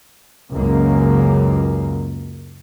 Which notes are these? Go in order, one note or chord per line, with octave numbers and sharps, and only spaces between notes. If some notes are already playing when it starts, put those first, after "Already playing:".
C#2 F#2 C#3 A#3